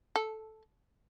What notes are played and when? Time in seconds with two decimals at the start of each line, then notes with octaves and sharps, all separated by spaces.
0.16 A4